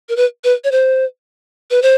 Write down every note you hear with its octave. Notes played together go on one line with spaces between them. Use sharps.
A#4
B4
B4
C#5
C5
B4
C5